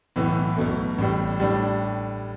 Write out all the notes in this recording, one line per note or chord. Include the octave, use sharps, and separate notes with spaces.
B1 A2 E3 B3
B1 B2 A3
A1 A2 G3
A2 G3 D4